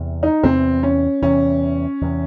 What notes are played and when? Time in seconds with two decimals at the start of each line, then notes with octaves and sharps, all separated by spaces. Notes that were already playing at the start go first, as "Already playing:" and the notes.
Already playing: E2 C3 E3
0.23 D#4
0.43 E2 C3 E3 C4
0.83 C#4
1.22 E2 C3 E3 C#4
2.01 E2 C3 E3